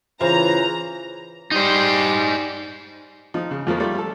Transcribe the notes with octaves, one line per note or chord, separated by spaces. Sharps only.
C#3 E3 F4 C5 A#5
G3 D#4 C5
F3 D#4
C#3
F2 F3 A3 A#3
G3 A3 F4
A4